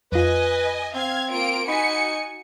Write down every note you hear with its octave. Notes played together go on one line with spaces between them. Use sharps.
F2 F4 B4 D#5 G#5
C4 F5 G#6
A#3 F4 D7
D#4 F#4 G#5 B5 B6 C#7